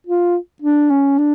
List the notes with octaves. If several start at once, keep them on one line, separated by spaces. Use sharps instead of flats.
F4
D4
C#4
D4